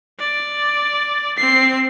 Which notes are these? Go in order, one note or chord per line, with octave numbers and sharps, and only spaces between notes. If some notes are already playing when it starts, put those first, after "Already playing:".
D5
C4 C7